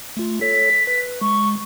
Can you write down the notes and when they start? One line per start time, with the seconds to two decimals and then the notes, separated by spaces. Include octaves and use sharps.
0.17 A3 F4
0.41 A4 C#5 B6
0.87 B4
1.21 G#3 C#6